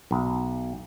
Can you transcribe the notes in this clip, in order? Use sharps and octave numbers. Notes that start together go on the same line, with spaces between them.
B1